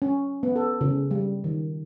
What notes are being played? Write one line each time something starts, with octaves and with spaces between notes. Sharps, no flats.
C#4
B3
A4
C#3
G3
D#3